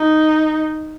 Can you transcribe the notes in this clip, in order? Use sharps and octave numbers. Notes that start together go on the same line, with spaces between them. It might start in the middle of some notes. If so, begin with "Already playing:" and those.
Already playing: D#4